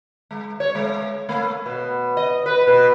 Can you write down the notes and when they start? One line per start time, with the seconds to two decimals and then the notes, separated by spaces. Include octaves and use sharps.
0.31 G#3
0.60 C#5
0.75 G#3
1.29 A3
1.66 B2
2.17 D#5
2.46 B4
2.67 B2